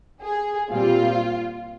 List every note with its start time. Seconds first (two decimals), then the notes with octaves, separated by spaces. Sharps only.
0.23 G#4
0.71 A#2 G3 C4 F4